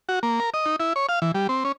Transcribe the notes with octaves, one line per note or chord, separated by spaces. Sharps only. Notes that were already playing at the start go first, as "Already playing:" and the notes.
F#4
A#3
A#4
D#5
D#4
E4
C#5
F5
E3
G3
C4
C#4